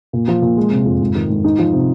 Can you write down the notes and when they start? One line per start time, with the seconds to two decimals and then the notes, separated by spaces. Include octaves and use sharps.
0.13 A#2
0.28 F3
0.42 A#2
0.57 G#3
0.71 C3
0.85 F2
1.01 G#2
1.15 D#3
1.30 G#2
1.44 D#4
1.59 F3
1.73 C3